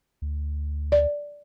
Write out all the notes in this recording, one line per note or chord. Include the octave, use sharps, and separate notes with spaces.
D2
D5